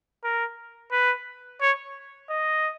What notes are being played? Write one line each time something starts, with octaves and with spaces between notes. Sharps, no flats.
A#4
B4
C#5
D#5